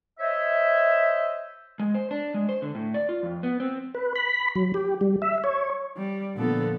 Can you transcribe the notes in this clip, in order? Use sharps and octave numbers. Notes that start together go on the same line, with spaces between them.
C5 C#5 D#5 E5
G#3
C5
D4
G#3
C5
D3
A2
D5
F4
F2
B3
C4
B4
B5
F#3
G4
G3
E5
C#5
G3
A#2 D3 F3 B3 A4